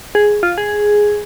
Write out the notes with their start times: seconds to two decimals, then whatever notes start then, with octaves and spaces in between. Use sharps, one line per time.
0.15 G#4
0.43 F4
0.58 G#4